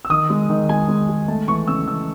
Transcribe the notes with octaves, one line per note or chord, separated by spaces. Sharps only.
E6
D#3 D#6
G#3
D#3
G#3 G#5
G#3
G#3
A3 A5
E3 C#6
C#3 E6
E3 E6